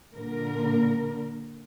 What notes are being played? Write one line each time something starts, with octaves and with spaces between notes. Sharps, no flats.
A#2 D3 A#4